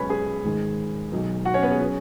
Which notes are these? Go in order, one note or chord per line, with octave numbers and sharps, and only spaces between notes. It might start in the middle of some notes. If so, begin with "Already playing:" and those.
Already playing: B1 B2 G#3 C#4 B4 C#5 B5
G#4 G#5
G#2 D#3 G#3
B1 B2 F#3 B3 D#4
F#4 F#5
C#4 C#5
B3 B4
G#4
F#3 C#4